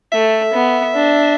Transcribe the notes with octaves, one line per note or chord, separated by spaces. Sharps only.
A3 E5
B3
D4